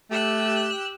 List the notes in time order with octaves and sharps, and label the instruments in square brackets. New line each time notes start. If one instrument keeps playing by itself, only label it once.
[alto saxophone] A3 [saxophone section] G4 [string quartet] E6 F#6